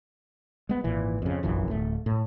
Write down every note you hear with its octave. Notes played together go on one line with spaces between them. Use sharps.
G#3 B3
G#1 A#2 E3
F2 C#3
F1 A#1 F#2 E3
D1 A3
A2